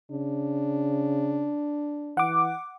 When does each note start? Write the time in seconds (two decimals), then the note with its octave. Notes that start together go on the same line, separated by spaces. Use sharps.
0.11 C#3 D4
2.17 E3 F#5 D6